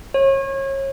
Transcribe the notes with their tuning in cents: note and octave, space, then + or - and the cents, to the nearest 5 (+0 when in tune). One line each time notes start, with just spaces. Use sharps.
C#5 -35